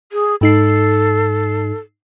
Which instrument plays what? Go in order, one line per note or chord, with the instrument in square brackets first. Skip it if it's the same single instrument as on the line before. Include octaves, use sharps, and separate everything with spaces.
[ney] G#4
[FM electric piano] G#2 D#4 C7 [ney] A4